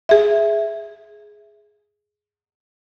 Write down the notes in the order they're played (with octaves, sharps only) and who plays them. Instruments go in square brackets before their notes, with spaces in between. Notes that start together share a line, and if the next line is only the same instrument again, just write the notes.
[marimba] G#4 E5